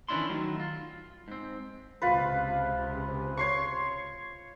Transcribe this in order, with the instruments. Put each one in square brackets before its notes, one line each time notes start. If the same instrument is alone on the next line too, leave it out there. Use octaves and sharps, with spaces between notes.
[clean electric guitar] D#3 E3 C#4 D4 E4 C6
D#3 F#3 A3
F4
G#2 C4
[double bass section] C#2 C3 [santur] F4 B4
[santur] C#5 C6 C#6